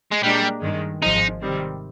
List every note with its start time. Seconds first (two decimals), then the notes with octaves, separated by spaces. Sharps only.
0.11 G#3
0.23 A#2 G3 G#3 D4 G4 A#4
0.62 G2 D#3 G#3
1.02 G#1 G#2 F3 G#3 D#4
1.41 C3 D#3 G3 C4